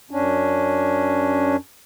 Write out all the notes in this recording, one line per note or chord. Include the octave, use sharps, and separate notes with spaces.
F#2 C#4 D4